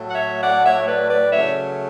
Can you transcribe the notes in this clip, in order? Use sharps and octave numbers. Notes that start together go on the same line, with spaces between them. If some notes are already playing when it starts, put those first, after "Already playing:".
Already playing: A2 F#3 A3
F#5
C#5 E5
D5 F#5
C#5 E5
B4 D5
B4 D5
C#3 F#3 A3 C#5 E5